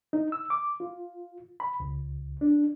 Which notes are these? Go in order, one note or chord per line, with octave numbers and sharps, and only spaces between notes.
D#4
E6
D6
F4
B5
C#2
D4